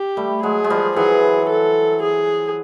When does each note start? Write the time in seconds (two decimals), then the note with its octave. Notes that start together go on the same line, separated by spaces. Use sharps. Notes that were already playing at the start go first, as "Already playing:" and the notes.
Already playing: G4
0.17 G3 A3
0.43 F#3 G#3 G#4
0.64 G#3
0.70 F3 G3
0.96 E3 F#3 G#4
1.49 A4
2.03 G#4